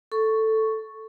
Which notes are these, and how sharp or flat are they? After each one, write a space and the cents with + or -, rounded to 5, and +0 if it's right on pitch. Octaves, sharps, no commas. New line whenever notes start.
A4 +0 C#6 +0